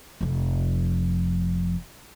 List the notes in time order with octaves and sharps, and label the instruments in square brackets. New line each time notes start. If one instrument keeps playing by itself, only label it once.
[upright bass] F1 F2